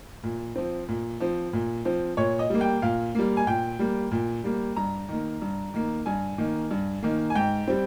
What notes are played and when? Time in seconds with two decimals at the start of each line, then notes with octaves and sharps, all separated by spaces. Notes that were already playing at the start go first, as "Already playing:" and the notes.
0.23 A#2
0.56 F3 C4
0.88 A#2
1.20 F3 C4
1.53 A#2
1.85 F3 C4
2.17 A#2 C#5
2.39 D#5
2.50 G3 A#3
2.61 G5
2.82 A#2 F5
3.15 G3 A#3
3.37 G#5
3.47 A#2 G5
3.79 G3 A#3
4.11 A#2
4.44 G3 A#3
4.76 G2 A#5
5.09 D#3 A#3
5.42 G2
5.74 D#3 A#3
6.06 G2 G#5
6.38 D#3 A#3
6.71 G2
7.03 D#3 A#3
7.30 G#5
7.35 G#2 G5
7.68 G3 C4